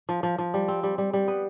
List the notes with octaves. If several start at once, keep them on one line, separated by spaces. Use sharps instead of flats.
F3
F3
F3
G3
C4
G3
G3
G3
B3